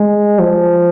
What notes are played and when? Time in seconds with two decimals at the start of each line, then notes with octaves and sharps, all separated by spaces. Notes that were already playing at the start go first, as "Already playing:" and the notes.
Already playing: G#3
0.39 F3